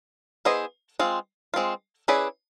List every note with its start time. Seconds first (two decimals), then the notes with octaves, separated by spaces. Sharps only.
0.45 B3 E4 G#4 C5 D#5
0.99 G#3 C4 F4
1.54 G#3 C4 F4
2.08 C#4 E4 G#4 B4 D5